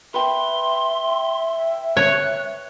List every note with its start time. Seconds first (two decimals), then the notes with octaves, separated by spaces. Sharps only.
0.14 B4 E5 G5 C6
1.97 C#5 F#6